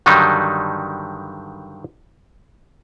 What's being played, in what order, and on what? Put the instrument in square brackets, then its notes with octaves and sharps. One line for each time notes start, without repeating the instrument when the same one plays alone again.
[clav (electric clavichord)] G2 D3 D#3 F#3 G3 D#4